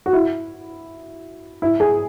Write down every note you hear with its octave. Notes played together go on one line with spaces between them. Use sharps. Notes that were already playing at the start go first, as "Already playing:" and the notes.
F#4
E4
E4
G#4